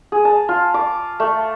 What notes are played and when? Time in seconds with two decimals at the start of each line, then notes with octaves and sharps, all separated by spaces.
0.12 G#4
0.25 A5
0.49 F4
0.74 D6
1.20 A3